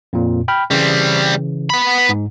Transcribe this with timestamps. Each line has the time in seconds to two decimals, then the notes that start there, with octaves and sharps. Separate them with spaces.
0.13 F2 A#2
0.48 G5 B5 F6
0.71 C#3 E3 G3 C4
1.70 B3 B5
2.09 G#2